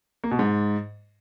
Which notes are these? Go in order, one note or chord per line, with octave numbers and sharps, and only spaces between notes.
A#3
B2
G#2